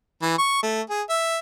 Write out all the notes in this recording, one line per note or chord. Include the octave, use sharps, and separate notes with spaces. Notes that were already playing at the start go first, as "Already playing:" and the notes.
E3
C#6
A3
G#4
E5